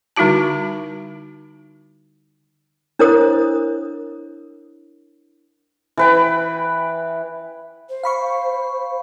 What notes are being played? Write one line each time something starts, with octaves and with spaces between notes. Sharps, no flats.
D3 G3 D#4 E4 F#4 A5
D4 E4 A#4 C5 C#5 D#6
E3 B4 G5
C5
F5 B5 C#6